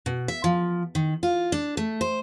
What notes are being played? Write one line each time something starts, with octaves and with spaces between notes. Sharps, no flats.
B2
E5
F3
D#3
F4
D4
A3
C5